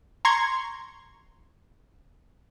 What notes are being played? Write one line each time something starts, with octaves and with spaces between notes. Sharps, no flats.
A#5 C6 C#6 G#6